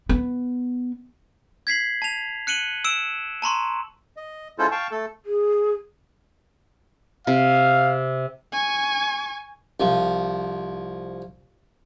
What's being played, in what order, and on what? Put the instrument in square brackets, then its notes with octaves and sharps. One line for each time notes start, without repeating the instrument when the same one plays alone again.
[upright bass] B3
[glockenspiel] G#6 B6 C7 F#7
A5 F7
F#6 C#7 D#7 F#7 G7
E6 D7 E7
A5 A#5 C6 C#6
[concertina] D#5
G#3 C#4 E4 F4 A4 C5
F5 G5 A5 C#6
A3 A4
[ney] G#4
[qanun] C3 [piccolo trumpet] F5
[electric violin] G#5 C#6
[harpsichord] C2 F3